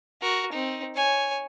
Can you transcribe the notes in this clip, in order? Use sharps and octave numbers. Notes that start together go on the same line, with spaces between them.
F#4 A#4
C4 D#4
C#5 G#5